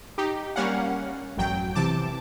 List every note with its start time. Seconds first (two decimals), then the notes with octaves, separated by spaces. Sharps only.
0.18 D#4 G4
0.56 G3 A#3 C#4 F5 F#5
1.37 A1 F#2 F#3 G5
1.75 C3 E3 A5 D6